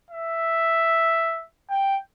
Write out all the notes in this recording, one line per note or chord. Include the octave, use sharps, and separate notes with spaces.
E5
G5